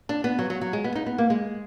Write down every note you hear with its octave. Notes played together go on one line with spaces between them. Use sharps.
D4
B3
F#3
F#3
F#3
G#3
B3
D#4
B3
A#3
G#3